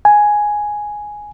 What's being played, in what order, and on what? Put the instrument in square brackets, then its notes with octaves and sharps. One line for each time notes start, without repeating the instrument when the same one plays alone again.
[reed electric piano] G#5